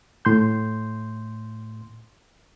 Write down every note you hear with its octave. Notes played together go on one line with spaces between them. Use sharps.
A2 C6 G6